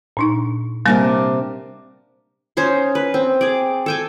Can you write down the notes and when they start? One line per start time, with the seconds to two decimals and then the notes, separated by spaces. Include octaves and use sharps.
0.17 A#2 D4 D#4
0.86 C3 G3 A#3 D4 A#4 A#6
2.57 C#4 D#4 C5 C6
2.95 B4
3.14 C4
3.41 G#4 D5
3.86 A4 G5 G#5